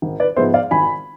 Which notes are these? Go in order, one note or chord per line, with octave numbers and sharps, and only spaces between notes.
G#1
B4 D5
G#2 F3 G#3 B3 C5 E5
D5 F5
G#1 G#5 B5